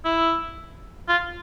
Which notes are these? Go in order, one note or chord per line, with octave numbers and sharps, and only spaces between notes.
E4
F4